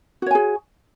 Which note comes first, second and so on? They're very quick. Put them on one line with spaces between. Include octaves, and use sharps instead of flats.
F#4 C#5 G#5 G#4